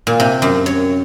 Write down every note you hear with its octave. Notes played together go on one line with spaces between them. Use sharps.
A#2
C3
F#2
C#5